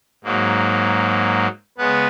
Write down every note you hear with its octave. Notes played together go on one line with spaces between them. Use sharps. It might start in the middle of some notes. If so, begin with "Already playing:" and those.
G#2 F#3 A#3
C#3 G#3 B3 B4